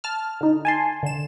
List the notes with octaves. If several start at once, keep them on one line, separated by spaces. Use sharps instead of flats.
A5 F6
D3 D#4
G#5 A5 C6
D3 E7